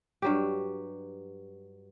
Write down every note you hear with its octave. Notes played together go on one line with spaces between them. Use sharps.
G2 F#3 G4